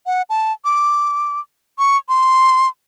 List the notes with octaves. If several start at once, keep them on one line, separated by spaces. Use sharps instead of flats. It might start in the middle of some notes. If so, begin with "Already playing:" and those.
F#5
A5
D6
C#6
C6